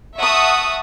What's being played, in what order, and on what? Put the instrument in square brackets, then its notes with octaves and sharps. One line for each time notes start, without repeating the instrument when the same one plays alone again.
[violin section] E5 F#5 A5 C#6 D#6